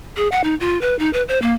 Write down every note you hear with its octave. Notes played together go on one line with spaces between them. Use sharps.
G#4
F#5
D#4
F4
B4
D#4
B4
C5
A#3